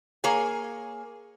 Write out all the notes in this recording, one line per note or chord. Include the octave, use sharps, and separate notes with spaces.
A#3 G#4 C#5 G#5